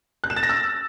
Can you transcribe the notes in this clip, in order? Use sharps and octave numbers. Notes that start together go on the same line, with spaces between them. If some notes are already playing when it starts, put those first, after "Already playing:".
F#6
E7
A6
A#6
E6